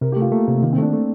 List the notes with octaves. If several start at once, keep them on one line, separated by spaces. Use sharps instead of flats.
C3 A#4
G4
A3
F4
A3 A#3
C3
D#3 A#3
C4
A3 D4
A3